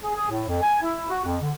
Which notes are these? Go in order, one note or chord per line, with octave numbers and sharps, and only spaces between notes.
G#4
G#4
A2
F2
G#5
E4
F#4
F2
D3